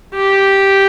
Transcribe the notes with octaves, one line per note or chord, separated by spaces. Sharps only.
G4